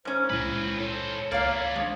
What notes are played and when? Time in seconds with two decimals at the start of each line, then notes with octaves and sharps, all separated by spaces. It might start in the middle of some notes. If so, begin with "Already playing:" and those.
0.05 G#2 C#4 C5
0.30 C#2 A#2 G#3 C4 E4 B4
0.78 A4 C5 C#5
1.32 C#2 A#3 E4 D5 F5
1.76 F3 G#3 C4 D4 F5